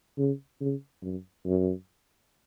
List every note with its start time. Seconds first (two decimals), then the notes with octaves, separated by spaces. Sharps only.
0.18 C#3
0.61 C#3
1.03 F#2
1.45 F#2